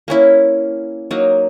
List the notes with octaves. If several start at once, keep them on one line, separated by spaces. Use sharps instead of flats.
A#3 C#4 E4
F#3 A#3 D#4